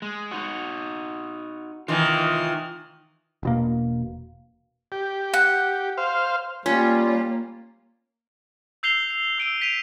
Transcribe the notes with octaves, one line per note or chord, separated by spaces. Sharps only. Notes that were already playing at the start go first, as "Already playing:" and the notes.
G#3
D#4 F#4
D#3 E3 F4 G#5
E1 B2 A#3
G4
F#5
C5 F5
G3 A#3 C#4 F4
E6 G6 C7 F7 G7
C7
E6 D7 D#7 G7
B6 D7 D#7 F7